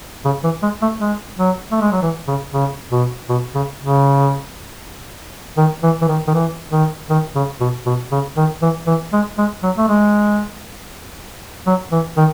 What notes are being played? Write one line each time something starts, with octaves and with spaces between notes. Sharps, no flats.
C#3
E3
G#3
A3
G#3
F#3
A3
G#3
F#3
E3
C#3
C#3
B2
B2
C#3
C#3
D#3
E3
E3
D#3
D#3
E3
D#3
D#3
C#3
B2
B2
C#3
D#3
E3
E3
G#3
G#3
F#3
A3
G#3
F#3
E3
D#3